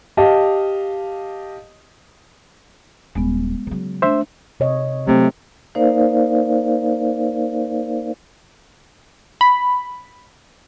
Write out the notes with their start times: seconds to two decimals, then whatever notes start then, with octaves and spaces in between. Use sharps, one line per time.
0.17 G4 D#5 F5 A5
3.15 D#1 G#3 B3
3.67 C#3 F#3
4.02 A3 D4 C5 E5
4.60 C3 C#5 D#5
5.07 C3 F#3 A3 C4
5.75 A#3 D#4 A#4 C5 D5 F5
9.41 B5